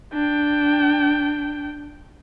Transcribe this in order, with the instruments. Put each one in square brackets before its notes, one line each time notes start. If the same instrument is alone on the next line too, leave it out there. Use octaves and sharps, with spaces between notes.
[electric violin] D4 G5